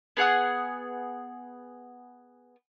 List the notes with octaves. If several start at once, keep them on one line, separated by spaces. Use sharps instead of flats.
B3 G#4 F#5 D#6